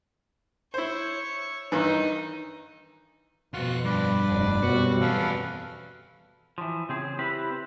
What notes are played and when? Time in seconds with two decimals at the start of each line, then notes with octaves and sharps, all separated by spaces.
0.74 E4 C5 C#5
1.72 G2 D#3 E3 D#4
3.54 F2 B2 F4 F#4 F#6
3.85 G2 B4 D5
4.28 F1 F2 C3
4.63 F#2 B2 G3 C4 F#4
5.01 E2 C#4 A4 B4 F5
6.58 E3 F3
6.89 C#3 C4 G#4
7.19 C4 E4 G4 B4